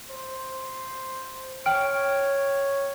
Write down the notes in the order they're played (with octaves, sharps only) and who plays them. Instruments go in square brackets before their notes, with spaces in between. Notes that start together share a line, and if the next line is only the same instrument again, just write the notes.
[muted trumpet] C5
[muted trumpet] C#5 [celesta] G5 F6 D7